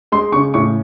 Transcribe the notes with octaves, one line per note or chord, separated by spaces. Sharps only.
G#3 C6
C#3 C#6
A2 C#6